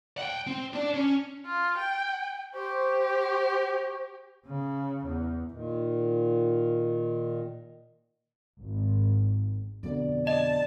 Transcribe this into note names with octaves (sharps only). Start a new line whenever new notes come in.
F#5 G5
C4
D4 D5
C#4
F4
G5
G4 C5 C#6
C#3
E2
A#2 D#3
G#1
F2 B2 D3 D5
D5 D#5 A5